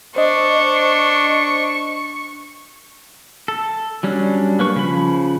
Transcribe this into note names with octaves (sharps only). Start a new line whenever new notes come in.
D4 C5 D#5 C#6
A4
F#3 G3 C#4 D4
A#3 B4 C#6
C#3 F3 B5